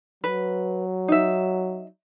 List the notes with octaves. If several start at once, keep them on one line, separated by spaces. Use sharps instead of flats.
F#3 B4
D#4 E5